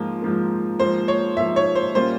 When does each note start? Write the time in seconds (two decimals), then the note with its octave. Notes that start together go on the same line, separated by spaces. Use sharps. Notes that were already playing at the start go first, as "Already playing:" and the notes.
Already playing: G#2 F3 A#3 F4
0.22 G#2 F3 A#3
0.79 G#2 F3 A#3 C5
1.08 C#5
1.36 G#2 F3 A#3 E5
1.56 C#5
1.75 C5
1.94 A#2 G3 A#3 C#4 F4 C5